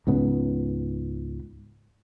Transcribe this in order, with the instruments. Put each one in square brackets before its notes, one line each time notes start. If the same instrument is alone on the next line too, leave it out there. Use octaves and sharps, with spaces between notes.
[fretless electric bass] C#2 G#2 C#3 B3